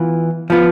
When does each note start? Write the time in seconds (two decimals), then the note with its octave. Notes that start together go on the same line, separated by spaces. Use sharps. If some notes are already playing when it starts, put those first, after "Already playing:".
Already playing: E3 B3 F4
0.50 F3 B3 F4